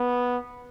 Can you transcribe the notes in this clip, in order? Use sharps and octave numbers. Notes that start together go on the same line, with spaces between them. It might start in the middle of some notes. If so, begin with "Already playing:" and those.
Already playing: B3